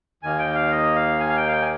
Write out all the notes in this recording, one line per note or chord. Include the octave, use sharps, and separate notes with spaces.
D#2 D#3 A#3 G#5
G5
F5
D#5
F5
G#5
F5
G5
F5
G5
G#5